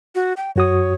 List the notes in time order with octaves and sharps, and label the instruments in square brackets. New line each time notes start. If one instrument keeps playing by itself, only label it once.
[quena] F#4
G5
[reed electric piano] F#2 F#4 D#6 [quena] C#5